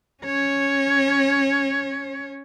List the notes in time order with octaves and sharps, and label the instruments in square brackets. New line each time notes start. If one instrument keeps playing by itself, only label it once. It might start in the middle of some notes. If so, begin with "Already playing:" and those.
[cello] C#4 C#5